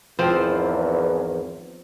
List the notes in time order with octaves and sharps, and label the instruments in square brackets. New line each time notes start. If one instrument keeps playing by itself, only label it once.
[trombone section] G#1 E2 [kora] F3 C4